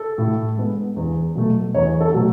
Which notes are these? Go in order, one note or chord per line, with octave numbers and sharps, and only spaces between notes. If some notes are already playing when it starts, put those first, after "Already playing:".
Already playing: A4
A2
G#3 B3
E2
B2 F#3 A3
E2 C#5
A4
B2 F#3 A3